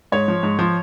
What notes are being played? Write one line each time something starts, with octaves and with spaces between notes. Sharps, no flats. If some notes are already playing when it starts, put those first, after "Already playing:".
G#2 C#5
F3
G#2
F3